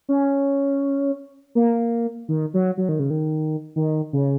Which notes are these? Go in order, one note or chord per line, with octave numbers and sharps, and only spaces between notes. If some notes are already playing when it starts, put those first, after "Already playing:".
C#4
A#3
D#3
F#3
F#3
D#3
C#3
D#3
D#3
C#3